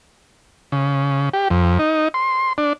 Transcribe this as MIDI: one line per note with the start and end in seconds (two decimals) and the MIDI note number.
0.72 1.29 49
1.33 1.48 67
1.50 1.78 41
1.79 2.08 63
2.14 2.53 84
2.58 2.73 62